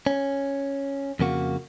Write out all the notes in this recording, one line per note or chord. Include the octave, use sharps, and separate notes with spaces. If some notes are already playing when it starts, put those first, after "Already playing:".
C#4
F2 C#3 A#3 F#4